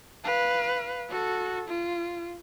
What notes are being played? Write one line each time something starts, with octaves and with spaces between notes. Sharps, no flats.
B4 F5
F#4 A4
F4